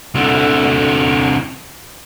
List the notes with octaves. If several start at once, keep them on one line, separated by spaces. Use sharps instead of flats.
C2 D3